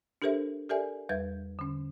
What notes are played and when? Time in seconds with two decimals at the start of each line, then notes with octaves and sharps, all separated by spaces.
0.22 D4 G4 A4 A#4 C5 E5
0.69 G4 A4 A#4 D5 E5 G#5
1.09 E2 G3 B4 E5 G#6
1.59 D3 C#4